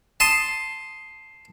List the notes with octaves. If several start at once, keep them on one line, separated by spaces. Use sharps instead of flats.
A5 C6 D#6